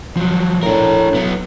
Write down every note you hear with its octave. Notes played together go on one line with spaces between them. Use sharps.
F3 F#3
A2 D4 A#4
F#3 B3